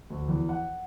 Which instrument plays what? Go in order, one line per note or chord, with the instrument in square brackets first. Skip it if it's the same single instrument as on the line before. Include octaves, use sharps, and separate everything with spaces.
[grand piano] D2
E2
F#5